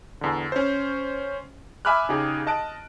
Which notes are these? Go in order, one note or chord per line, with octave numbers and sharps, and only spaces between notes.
E2 D3
C#4 C5
E5 G#5 B5 D6 F6 F#6
C#3 D#4 G4 G#4
D#5 A5 F#6 D7